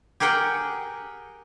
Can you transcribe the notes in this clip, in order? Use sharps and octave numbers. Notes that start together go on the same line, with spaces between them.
G4 G#4 A#4 F#5 G5